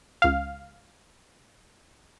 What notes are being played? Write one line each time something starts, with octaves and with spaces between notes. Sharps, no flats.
C#2 F5